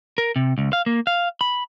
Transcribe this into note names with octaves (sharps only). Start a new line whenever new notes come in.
A#4
C3
C#2
F5
A#3
F5
B5